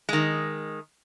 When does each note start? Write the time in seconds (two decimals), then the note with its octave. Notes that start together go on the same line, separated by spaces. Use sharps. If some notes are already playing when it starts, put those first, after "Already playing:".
0.09 D#3 G#3